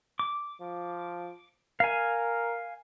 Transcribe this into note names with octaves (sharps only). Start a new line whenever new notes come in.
D6
F3
A#4 F5 G#5